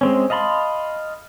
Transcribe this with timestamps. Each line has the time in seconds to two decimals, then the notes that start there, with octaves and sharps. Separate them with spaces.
0.01 G#3 C4 C#4
0.30 D#5 F5 A5 B5 C6